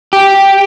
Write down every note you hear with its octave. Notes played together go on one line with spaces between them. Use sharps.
G4